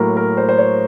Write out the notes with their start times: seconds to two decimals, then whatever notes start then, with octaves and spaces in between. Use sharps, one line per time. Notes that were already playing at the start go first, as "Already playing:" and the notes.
Already playing: A2 F#3 A#3 A#4
0.17 A#4
0.37 C5
0.49 C5
0.58 C#5